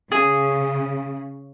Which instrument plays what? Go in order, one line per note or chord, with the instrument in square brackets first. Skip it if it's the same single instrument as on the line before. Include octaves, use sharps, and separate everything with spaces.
[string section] C#3 [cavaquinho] G#4